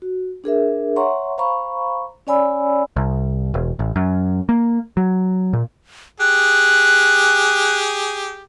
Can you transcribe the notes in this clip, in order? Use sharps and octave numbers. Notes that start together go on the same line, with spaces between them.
F#4
D4 G#4 A#4 E5
C#5 E5 F#5 A#5 C6 C#6
C5 F5 A#5 B5 C#6
C#4 C#5 D5 G#5 B5 E6
C2
E1
A1
F#2
A#3
F#3
A#2
G4 G#4 F#6